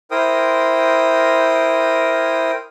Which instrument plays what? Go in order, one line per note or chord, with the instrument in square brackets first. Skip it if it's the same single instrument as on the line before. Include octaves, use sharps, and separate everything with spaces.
[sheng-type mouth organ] E4 A#4 C5 G5 D#6